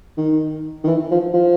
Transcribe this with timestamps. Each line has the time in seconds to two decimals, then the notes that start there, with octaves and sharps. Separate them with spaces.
0.18 D#3
0.84 D#3
0.87 E3
1.11 F3
1.34 F3